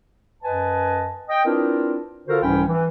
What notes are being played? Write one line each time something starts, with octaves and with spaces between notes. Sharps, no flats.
F#2 B4 D#5 G#5 A5
D#5 G5
C4 D4 E4 F4 A#4 B4
D3 F4 F#4 A4 A#4 C5
C2 G#2 E3 C#4 G5 B5
E3